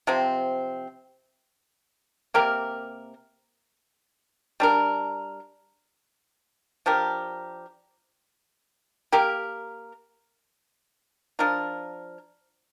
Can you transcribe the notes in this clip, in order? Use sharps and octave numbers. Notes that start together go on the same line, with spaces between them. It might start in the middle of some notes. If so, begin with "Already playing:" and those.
C3 F3 C4
C3 A#3 G4 A#4
G3 D4 A#4
F3 D4 G4 A#4
A#3 G4 A#4
F3 D4 F4 A#4